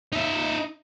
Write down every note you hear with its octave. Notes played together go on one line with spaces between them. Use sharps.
D#4 E5